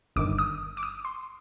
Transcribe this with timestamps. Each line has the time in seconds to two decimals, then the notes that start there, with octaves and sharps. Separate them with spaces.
0.16 G1 G2 D#3 D6
0.38 D#6
0.77 D6
0.83 D#6
1.05 C6